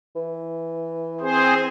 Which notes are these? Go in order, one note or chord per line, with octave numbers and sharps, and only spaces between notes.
E3
C4 G#4 C5